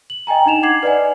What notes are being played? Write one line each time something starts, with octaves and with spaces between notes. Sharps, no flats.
F#7
D#5 G5 G#5 A#5
D4 D#4 E7 F7
F#5 D6 G#6 C7 F#7
B4 D5 D#5 F#5 G#5